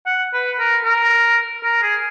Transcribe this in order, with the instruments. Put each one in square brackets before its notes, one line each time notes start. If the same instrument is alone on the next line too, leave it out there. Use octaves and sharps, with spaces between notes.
[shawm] F#5
B4
A#4
A#4
A#4
G#4